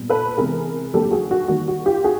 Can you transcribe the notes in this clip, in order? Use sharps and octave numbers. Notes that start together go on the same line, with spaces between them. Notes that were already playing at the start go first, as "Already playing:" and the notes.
Already playing: A#2 G3 B3
A4 B4
C3 E3 G#3 B3 G#4 A#4
D3 F#3 A#3 G4 A4
F#4 G#4
F#4
D#3 G3 A#3 F#4
F#4
F4 G4
F#4 G#4